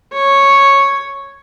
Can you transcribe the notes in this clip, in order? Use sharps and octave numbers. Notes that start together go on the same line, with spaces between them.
C#5